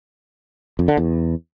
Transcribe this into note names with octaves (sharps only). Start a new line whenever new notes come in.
F2
D3
E2